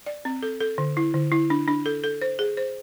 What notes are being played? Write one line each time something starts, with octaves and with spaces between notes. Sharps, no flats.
D5
C4
A4
A4
D3
E4
D3
E4
D4
D4
A4
A4
C5
G#4
C5